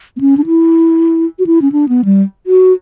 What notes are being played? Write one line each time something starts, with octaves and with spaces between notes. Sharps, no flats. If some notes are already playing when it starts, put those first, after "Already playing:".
B3
C#4
D4
E4
F#4
E4
C#4
D4
B3
G3
F#4